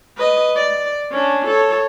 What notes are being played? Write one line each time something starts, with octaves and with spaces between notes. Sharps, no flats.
B4 D#5
D5
C#4 D4
A4 C#5